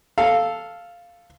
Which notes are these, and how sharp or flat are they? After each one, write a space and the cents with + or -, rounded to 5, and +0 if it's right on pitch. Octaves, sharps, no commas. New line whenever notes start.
A4 +0 F5 -5